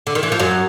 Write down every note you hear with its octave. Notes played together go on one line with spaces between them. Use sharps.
D3
D#3
E3
F3
F#2 F#3